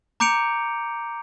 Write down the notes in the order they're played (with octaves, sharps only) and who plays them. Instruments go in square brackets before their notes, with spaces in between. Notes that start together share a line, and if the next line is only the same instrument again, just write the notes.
[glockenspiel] A#5 D6 G6 C#7 D7 F7